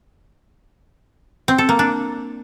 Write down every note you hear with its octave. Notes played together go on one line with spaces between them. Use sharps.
C4
A4
A#3
D4